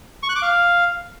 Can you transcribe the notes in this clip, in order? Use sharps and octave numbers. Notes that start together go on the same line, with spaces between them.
C#6
F#6
D6
F5